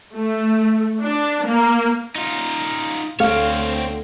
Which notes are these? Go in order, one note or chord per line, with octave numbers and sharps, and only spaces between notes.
A3
D4
A#3
D#4 F4
D2 C4 A4 C#5 F5